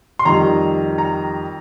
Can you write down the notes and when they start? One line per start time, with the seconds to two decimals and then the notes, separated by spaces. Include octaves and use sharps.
0.19 C6
0.25 F2 D#3 G3 A#5
0.98 A#5